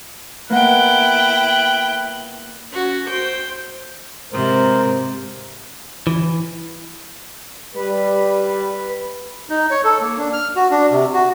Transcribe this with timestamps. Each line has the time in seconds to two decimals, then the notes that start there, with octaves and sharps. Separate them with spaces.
0.50 A#3 B3 E4 F#5 G5 F#6
2.72 C#4 F#4
3.09 C5 G5
4.32 G#2 C3 A#4 C5
6.07 E3
7.75 G3 B4
9.50 D#4
9.71 C#5
9.84 A4
10.01 A#3
10.17 D4
10.33 F6
10.56 F#4
10.71 D4
10.92 C3
11.13 F#4